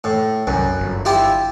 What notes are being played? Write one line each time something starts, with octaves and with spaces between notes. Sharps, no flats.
A2
C2 F#2
G1
E4 F4 G4